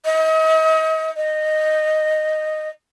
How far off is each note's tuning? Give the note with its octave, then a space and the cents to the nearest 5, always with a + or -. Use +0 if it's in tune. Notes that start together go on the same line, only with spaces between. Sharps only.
D#5 +40
D#5 -10